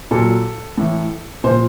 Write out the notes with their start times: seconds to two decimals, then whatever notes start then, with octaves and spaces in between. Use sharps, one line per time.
0.11 A#2 F#3 A4
0.78 A2 E3
1.44 A#2 F3 C5